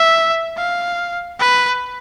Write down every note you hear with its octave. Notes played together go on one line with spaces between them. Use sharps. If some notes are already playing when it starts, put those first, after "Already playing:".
Already playing: E5
F5
B4